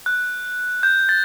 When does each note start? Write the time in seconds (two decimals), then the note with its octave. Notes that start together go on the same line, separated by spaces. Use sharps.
0.06 F#6
0.83 G6
1.09 A6